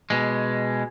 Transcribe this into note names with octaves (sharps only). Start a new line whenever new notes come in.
B2 G#3